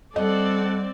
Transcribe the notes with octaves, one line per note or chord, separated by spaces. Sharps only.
G3 C4 A4 D5 D#5 F#5